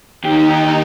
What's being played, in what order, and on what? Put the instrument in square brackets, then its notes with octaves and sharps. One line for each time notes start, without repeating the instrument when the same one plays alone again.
[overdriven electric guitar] D#2 G4 [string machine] D#4